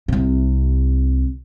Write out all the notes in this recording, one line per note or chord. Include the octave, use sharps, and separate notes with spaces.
C2 C3